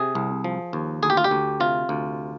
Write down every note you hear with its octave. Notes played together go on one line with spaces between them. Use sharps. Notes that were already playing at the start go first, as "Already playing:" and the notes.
Already playing: C3 G#4
C2
F3
D#2
D2 G#4
G4
F4
G4
D2
C3 F4
D2